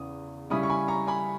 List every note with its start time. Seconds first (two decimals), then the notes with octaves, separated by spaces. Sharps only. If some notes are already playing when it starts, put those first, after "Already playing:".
Already playing: E2 C#3 E3 D#6
0.50 C#3 G3 C#4 E4 B5 D#6
0.63 C#6
0.69 G#5 B5
0.88 A#5 C#6
1.07 G#5 B5